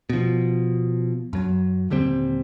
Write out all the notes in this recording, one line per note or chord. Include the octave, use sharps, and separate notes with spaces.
B2 F3
F#2 F#3
D#1 D3 G3 C4